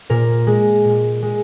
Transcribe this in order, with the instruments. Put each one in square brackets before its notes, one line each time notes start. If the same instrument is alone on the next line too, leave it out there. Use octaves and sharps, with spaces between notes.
[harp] A#2 A#4
G#3
A#2
G#3